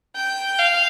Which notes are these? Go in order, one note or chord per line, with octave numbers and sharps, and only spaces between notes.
G5
F5